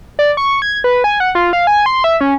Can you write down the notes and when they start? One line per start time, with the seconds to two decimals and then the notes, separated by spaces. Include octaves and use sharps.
0.19 D5
0.37 C#6
0.62 G#6
0.84 B4
1.04 G#5
1.20 F#5
1.35 F4
1.53 F5
1.67 G#5
1.86 C6
2.04 E5
2.21 C#4